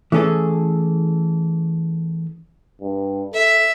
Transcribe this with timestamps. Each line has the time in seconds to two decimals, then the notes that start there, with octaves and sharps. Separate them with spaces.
0.12 E3 A3 C#4 G#4 A4
2.82 G2
3.34 A4 E5